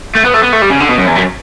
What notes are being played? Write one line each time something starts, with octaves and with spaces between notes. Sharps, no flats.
A3
B3
A3
B3
A3
G3
C#3
D3
B2
F#2
E2
F#2